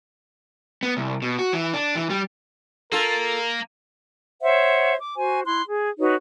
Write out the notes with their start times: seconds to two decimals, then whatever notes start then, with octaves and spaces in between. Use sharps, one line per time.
0.83 B3
0.97 C2
1.22 B2
1.39 F#4
1.53 E3
1.74 D4
1.95 E3
2.10 G3
2.92 A#3 F4 A4 A#4
4.42 C5 C#5 E5 F#5
4.99 D6
5.16 F#4 C5 G#5
5.46 E4 C6 F#6
5.66 G#4
5.99 D#4 F#4 B4 C#5